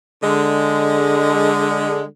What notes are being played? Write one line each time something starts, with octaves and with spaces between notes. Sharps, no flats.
D3 G#3